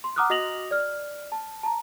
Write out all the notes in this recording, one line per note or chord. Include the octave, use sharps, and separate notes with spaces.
C6
F#5 A#5 D6 D#6 F6 F#6
F#4 D#5 D#6 A#6 F7 F#7
D5 F6
A5
A5 A#5